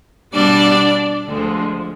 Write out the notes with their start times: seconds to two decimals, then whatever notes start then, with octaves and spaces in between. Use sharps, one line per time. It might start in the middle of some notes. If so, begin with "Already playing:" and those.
0.34 B2 G3 D4 D5
1.29 D2 D3 F3 G#3